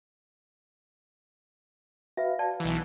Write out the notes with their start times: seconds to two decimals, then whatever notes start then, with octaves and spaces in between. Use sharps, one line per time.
2.17 F#4 B4 E5 F5
2.39 D5 G5 A5
2.60 B1 E3